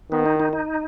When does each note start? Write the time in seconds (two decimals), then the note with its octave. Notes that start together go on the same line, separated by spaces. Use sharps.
0.11 D#3 B3
0.26 D#4
0.40 D#4
0.53 D#4